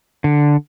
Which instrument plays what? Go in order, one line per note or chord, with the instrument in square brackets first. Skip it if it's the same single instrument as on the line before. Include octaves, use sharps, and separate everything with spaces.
[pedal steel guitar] D3